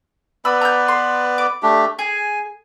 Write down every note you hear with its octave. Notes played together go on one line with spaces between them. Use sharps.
B3 B4 D5 B5 E6
A#5 G6
C6
D6
A3 D4 G4
G#4 G#5